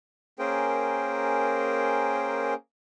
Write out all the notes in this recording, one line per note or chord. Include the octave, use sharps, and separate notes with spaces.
A#3 C#4 G#4 A#4 C5 G5